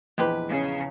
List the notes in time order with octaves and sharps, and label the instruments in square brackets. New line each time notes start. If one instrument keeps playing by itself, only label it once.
[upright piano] A#1 E2 E3 [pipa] G#3 G4 B4
[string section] C#3